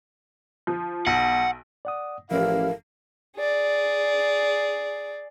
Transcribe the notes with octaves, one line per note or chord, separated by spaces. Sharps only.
F3
B1 F#5
D5 F#5 D#6
A1 F3 C#4 E4 G4 A4 A#4 F5
G#4 D5